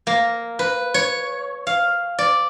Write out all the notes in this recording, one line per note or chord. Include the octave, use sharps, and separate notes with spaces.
A#3
B4
C#5
F5
D5